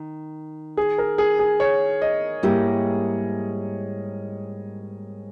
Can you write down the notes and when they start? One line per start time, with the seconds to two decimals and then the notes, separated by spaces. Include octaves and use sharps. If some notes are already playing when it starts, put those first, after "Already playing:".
Already playing: D#3
0.77 G#4
0.98 A#4
1.18 G#4
1.39 G#4
1.60 C#5
2.02 D#5
2.43 G#2 G3 A#3 E4 G4